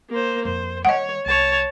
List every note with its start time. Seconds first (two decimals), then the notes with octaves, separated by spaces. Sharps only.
0.10 A#3 C5
0.45 F2 C5
0.85 D#3 G3 C#5 D#5 F#5
1.26 C2 C#5 A5